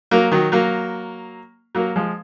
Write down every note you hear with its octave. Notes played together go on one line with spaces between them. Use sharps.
F#3 A#3
D#3 F#3
F#3 A#3
F#3 A#3
F3 G#3